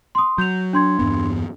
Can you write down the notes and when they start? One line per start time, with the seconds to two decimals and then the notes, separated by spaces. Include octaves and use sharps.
0.15 C6 D#6
0.38 F#3 G6 F7
0.73 D4 C6 G#6
0.99 E2 G2 B3